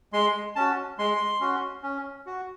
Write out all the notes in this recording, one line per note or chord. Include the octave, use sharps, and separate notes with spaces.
G#3 C6
C#4 F#4 A5
G#3 C6
C#4 F#4
C#4
F#4